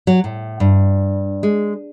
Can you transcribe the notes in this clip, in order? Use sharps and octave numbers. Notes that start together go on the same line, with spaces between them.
F#3
A2
G2
G#3